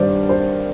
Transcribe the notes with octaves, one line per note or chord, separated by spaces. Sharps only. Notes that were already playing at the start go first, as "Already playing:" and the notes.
Already playing: G2 D#3 G3 C5 D5
C5